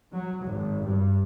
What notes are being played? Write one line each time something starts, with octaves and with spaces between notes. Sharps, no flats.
F#3
G#1
G2